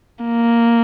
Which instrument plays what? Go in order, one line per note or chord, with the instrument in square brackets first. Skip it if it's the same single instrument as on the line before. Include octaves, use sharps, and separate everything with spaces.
[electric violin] A#3